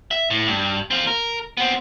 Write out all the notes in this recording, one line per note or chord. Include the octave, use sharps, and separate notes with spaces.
E5
A2
G2
C4 F4
A#4
B3 C4